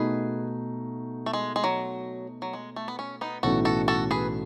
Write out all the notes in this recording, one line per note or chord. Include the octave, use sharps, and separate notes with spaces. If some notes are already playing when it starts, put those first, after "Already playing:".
Already playing: B2 A3 D#4 G#4 B4
A3
G#3
G#3
F#3
F#3
G#3
A3
B3
C#4
B3 D#4
B1 A2 E3 A3 C#4 F#4 A4
F#4 A4
F#4 A4
G#4 B4